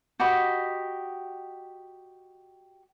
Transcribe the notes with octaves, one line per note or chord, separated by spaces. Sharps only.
F#4 G4 D#5 B5